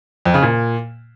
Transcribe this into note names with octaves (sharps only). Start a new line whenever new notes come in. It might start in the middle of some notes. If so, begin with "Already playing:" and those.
F2
C#3
A#2